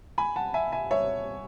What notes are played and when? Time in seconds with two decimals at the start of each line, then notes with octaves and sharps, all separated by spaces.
0.18 G#5 B5
0.36 F#5 A5
0.54 E5 G#5
0.72 E5 G#5
0.91 C#5 E5